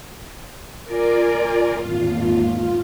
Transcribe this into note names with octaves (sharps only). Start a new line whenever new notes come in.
F4 A#4 D5 G#5
G#1 E2 A#2